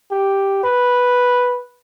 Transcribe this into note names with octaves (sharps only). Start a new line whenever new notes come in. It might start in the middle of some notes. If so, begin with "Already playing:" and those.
G4
B4